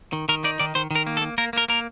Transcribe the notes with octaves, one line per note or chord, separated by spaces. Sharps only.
D#3
D#3 A#4
D#4 D5
D#3 D5
D#3 C5
D#3 A#4
A#3
A4
A#3
A#3 A#4
A#3 A#4
A#3 A#4